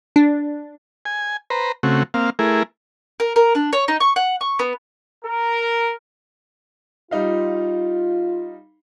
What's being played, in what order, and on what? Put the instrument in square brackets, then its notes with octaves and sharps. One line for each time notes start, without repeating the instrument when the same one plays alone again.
[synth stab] D4
[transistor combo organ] G#5
B4 C5 A#5
C#3 A3 C4 F#4
A#3 C4 F5
A3 E4 G#4 A#4
[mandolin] A#4
A#4
D4
C#5
D#4
C#6
F#5
C#6
B3
[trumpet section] A#4
[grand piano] G3 D#4 F5 [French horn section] F4